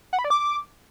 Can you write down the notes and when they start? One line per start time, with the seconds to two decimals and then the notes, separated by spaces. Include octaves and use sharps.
0.13 F#5
0.19 B5
0.24 D5
0.30 D6